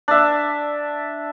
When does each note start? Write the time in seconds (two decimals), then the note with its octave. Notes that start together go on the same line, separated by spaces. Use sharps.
0.08 D4 E5